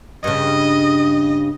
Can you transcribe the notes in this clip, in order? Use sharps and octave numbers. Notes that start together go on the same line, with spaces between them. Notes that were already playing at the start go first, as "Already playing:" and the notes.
G2 C#3 D#5